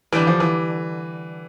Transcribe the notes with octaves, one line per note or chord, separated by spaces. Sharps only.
D3 E3 G3 D4 G4
F3
E3